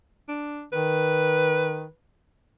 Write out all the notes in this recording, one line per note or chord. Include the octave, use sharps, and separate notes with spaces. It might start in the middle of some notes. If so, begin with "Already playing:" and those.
D4
D#3 B4